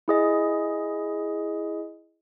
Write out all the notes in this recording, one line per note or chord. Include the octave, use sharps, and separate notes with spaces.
E4 G#4 D#5